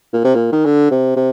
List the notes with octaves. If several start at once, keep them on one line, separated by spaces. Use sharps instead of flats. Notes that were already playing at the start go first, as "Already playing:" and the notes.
A#2
C3
A#2
D#3
D3
C3
C3